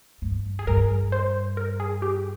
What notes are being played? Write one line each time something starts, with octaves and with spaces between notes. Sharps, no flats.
G2
G#4
G2 A#4
C5
A#4
G#4
G4